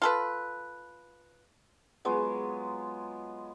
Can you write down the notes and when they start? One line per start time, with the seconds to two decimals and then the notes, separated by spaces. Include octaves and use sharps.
0.02 F4 A4 B4
2.05 F#3 G#3 B3 F4